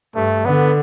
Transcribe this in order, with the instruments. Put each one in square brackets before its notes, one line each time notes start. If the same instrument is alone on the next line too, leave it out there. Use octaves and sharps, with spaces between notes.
[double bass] G2 [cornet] A3
[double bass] D3 [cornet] B3